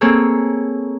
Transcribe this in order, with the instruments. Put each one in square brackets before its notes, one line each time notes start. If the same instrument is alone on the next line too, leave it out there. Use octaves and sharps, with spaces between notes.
[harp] A#3 C4 G#4 A4 C#5